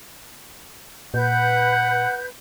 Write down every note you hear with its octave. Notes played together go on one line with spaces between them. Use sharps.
A#2 B4 F#5 G6